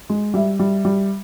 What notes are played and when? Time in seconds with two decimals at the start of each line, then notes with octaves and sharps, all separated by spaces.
0.09 G#3
0.34 G3 E5
0.59 G3
0.85 G3